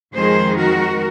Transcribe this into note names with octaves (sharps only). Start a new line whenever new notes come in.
F2 D#3 G#3 G#4 C5
F#4 A#4